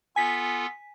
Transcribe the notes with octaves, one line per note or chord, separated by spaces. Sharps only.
B3 F4 A4 G#5 B6